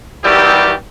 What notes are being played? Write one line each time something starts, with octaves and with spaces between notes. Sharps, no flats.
D#3 E3 F#3 G3 C4 G4